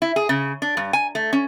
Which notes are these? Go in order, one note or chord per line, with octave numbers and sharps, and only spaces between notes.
E4
G#4
C#3
D4
G2
G#5
A3
C#4